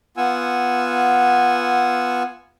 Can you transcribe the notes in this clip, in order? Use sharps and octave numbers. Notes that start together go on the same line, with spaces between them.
B3 F4 F#5 G#5 E6